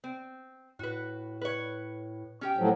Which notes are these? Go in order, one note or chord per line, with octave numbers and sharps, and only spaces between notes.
C4
A2 F#4 B4
B4 C#5
C#4 G4 G5
A2 F3 F#3